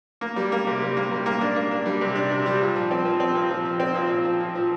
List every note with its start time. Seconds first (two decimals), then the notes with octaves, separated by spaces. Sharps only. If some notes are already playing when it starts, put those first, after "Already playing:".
0.21 A#3
0.36 G3
0.52 A#3
0.67 C3
0.82 G3
0.97 A#3
1.11 G3
1.26 A#3
1.41 D4
1.56 A#3
1.71 D4
1.86 G3
2.01 C3
2.15 D4
2.31 C3
2.46 G3
2.61 A#2
2.76 F3
2.91 C4
3.05 F3
3.20 C4
3.35 A#2
3.50 F3
3.65 F3
3.80 C4
3.94 A#2
4.10 A#2
4.25 F3
4.40 A#2
4.55 F3